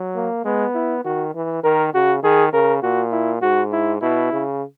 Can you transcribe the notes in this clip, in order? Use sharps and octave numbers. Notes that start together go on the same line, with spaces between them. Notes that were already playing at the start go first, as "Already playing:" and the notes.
Already playing: F#3
A#3
G#3 B3
E4
D#3 F#4
E3
D#3 A#4
C#3 F#4
D#3 G#4
C#3 A#4
A#2 F#4
E4
G#2 F#4
E4
B2 E4
C#3